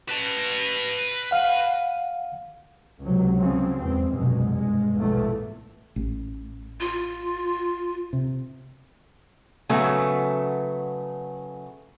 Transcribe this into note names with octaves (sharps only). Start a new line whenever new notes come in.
B4 A5
F5 F#5
C#2 C3 F#3
C#3 F3 F#3 C4
E2 G#2 C4
F1 C2 F#2 B2 G#3
G2 G#3
A#1 E2 G#2 B2 E3 A3
A1
F4
C3
C#3 F#3 A3 B3